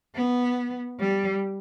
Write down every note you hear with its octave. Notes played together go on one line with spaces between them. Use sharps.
B3
G3